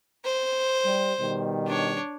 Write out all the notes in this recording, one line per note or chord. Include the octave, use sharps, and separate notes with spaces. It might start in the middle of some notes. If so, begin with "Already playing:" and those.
C5
G3
B2 D#3 G3
D4 C#5